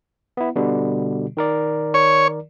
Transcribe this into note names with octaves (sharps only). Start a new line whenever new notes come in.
B3 E4
B2 D3 G3
D#3 A#4 D5
C#5